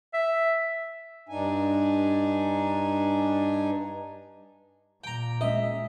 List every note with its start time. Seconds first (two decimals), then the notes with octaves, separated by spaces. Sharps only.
0.14 E5
1.29 G2 D4 D#4 G#5
5.04 A#2 G5 A#5
5.41 G#3 C#4 D#5 E5